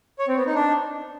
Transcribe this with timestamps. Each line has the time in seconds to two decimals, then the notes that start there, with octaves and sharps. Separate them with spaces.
0.19 C#5
0.28 C4
0.37 B3
0.46 D#4
0.55 D4